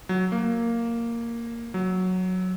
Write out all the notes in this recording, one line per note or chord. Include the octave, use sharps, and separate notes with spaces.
F#3
A#3
F#3